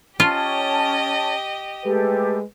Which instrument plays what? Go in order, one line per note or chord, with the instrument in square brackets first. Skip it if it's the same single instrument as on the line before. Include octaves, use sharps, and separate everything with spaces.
[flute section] C#4 A5 [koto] F4 [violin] G4 D#5
[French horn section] G#3 A3 B4 [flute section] G4 A4